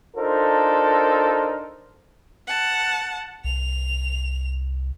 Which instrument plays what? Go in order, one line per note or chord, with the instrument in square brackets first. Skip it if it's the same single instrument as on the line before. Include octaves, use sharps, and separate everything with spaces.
[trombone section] D4 D#4 F4 A4 A#4 C5
[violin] F#5 A5
[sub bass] C2 [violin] F7